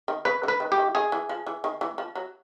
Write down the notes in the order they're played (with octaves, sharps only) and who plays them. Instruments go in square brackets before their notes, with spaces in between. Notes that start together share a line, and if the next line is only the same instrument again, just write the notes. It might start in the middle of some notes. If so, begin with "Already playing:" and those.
[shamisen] D#3
[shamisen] C#3 [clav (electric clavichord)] B4
[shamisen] D3
[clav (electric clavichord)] B4
[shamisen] D#3
[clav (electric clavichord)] G4
[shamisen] D#3
[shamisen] D#3 [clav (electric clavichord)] G#4
[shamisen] E3
F3
E3
D#3
E3
F3
F#3